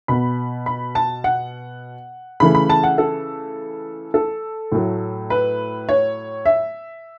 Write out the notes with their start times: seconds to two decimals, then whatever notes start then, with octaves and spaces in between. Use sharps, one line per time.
0.08 B2 B3 B5
0.66 B5
0.95 A5
1.24 F#5
2.40 C#3 E3 A3 B5
2.55 B5
2.69 A5
2.83 F#5
2.98 A4
4.14 A4
4.72 A2 F#3 A3
5.30 B4
5.89 C#5
6.46 E5